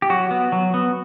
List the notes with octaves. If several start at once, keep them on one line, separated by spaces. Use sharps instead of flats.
G4
F#3 F#4
B3
F#3
B3